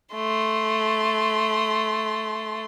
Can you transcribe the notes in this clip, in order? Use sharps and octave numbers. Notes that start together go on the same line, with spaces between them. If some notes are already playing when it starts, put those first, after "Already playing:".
A3 C6